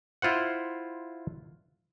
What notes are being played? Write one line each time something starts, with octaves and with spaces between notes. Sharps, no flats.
E4 F4 C5 F#5